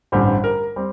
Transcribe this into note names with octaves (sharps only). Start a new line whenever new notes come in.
A1 G2 D3 G3 C4
A#4
G3 C4